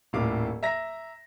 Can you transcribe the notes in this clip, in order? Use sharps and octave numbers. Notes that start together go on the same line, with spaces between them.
D#1 A2 F5 D6
E5 A#5 A#6